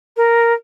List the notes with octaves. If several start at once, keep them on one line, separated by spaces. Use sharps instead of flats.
A#4